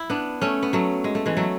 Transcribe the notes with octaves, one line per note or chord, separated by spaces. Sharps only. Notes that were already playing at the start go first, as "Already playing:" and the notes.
Already playing: E4
B3 D4
A3 C#4
B3
F#3 A3
G#3
A3
E3 G#3
F#3 A3